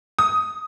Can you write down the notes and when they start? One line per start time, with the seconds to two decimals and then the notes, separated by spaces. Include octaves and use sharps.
0.19 D#6